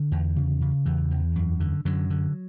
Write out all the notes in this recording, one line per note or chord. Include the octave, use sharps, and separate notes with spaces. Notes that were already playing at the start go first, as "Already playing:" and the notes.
Already playing: D3
E2
C#3
C#3
E2 E3
E2
F#2
D3
F#2 D3 F#3
D3